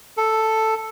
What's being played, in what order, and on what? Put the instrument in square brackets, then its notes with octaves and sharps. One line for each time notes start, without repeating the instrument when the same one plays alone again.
[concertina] A4